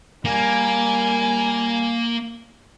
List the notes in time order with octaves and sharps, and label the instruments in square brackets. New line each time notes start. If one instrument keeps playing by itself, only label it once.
[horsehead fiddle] G3 G#5 [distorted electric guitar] A#3